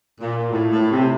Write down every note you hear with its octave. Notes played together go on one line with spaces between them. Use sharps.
A#2
A2
A2
C3